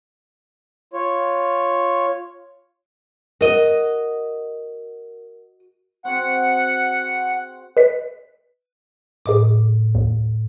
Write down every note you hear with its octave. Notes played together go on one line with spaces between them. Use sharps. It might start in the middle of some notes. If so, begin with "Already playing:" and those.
F4 C#5
F#4 A#4 D#5
C4 F#4 G#4 F#5
B4 D#5 B6
A2 G#4 D#5 D6
D#2